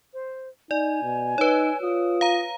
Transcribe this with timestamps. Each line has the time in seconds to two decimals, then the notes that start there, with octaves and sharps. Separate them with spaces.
0.13 C5
0.71 D#4 D5 G#5
1.03 B2
1.38 D#4 B4 C#5
1.83 F4 D#6
2.21 F5 A#5